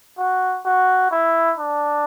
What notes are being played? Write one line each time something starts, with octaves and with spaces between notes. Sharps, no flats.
F#4
F#4
E4
D4